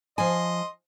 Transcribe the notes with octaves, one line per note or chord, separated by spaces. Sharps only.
F3 D#5 G#5 C6